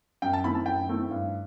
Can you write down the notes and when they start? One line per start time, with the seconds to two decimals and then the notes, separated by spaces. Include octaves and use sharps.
0.22 F#2 G5
0.33 A5
0.44 D#3 A3 C4 E4 B5
0.55 A5
0.66 F#2 G5
0.88 D#3 A3 C4 E4
1.11 G2